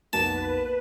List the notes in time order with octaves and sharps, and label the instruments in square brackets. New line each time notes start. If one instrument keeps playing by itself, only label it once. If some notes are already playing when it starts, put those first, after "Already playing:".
[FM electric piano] B1 F2 D#4 [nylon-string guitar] A#3 B3 F#4 [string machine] B4 [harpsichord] A5